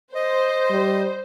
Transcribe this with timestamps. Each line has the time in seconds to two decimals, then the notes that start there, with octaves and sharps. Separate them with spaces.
0.15 C5 D#5
0.70 G3